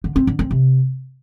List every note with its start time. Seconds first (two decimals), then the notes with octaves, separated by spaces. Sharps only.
0.04 D3
0.16 C4
0.27 D3
0.39 C4
0.51 C3